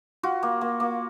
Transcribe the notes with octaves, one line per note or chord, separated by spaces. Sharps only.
F4 F#4
A#3
A#3
A#3